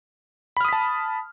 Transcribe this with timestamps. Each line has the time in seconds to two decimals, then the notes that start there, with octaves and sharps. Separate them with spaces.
0.57 B5
0.61 F6
0.65 D#6
0.69 B6
0.73 A5